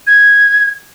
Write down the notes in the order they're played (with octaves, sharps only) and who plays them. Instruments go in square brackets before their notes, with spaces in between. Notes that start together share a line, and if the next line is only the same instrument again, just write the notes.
[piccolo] G#6